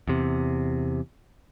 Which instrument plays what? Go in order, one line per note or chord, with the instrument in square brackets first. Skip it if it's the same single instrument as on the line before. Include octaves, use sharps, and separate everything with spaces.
[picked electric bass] E2 C3